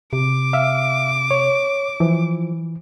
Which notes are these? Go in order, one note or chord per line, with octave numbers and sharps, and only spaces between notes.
C3 D6
E5 F5
C#5
E3 F3